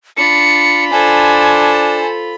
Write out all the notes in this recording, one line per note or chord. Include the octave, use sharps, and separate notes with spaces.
D4 F4 B5 C#7
D4 A4 C5 G#5